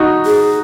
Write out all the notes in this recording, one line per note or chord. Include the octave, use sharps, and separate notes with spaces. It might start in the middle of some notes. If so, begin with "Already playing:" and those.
Already playing: D#4 F#4
G#4